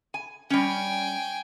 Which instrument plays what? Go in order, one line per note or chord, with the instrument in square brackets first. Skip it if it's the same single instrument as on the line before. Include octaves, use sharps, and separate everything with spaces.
[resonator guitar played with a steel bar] G#5
[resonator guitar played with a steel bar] G3 C#4 [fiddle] G5 G#5